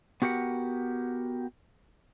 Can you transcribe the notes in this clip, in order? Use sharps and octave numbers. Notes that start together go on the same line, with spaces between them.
B3 F#4 G4 A#4 F#5